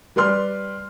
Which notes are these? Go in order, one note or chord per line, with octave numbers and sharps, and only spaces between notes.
G3 G4 B4 D5 C6 F6